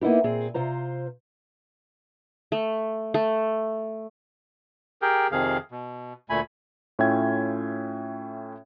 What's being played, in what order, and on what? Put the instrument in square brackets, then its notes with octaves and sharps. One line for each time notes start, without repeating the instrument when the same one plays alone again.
[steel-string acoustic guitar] A#3 B3 D#4 E4 G4
A#2 C4 G#4
C3 F4 C5 A#5
[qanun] A3
A3
[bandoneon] G4 G#4 A#4 G5
F2 C3 D#3 F3 G#4 F5
B2
D2 A#2 A3 G#5 B5
[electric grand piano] A2 C#4 F4 E5 G5 G#6